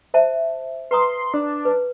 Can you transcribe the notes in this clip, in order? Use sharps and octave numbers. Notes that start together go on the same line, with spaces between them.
C5 E5 A5
B4 A#5 C6 D#6
D4
B4